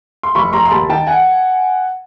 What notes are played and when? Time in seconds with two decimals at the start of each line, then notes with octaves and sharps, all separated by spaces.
0.23 C6
0.35 F1 B5 C#6
0.53 F1 A#5 C6
0.66 C6
0.71 D#2 A5 B5
0.89 D#3 G5 A5
1.07 F#5 G#5